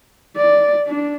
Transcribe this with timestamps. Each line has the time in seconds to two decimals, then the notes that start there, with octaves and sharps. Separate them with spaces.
0.37 D5
0.87 D4